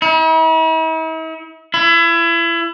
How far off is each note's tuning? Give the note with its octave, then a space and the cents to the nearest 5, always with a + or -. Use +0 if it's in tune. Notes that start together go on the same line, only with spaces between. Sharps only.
E4 -45
E4 +30